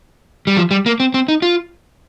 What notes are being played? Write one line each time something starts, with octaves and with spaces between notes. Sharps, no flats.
G3
F3
G3
A#3
C4
C4
D#4
F4